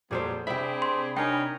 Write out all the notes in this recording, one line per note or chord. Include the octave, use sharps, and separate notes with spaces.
F2 A#2 F#3 G3 B3 G#4 A4 C5
C3 C4 D4 G#4 E5 G5 B5
C6
D4 D#4 A#4 C#5 G5 G#5